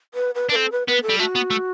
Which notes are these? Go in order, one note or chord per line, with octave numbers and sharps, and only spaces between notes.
B4
B4
D4 B4
C4 A4
B4
B3 B4
A4
G3
A3 F#4
B3
A3